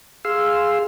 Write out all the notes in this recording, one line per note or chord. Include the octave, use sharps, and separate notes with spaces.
G#4 F5 C6 E6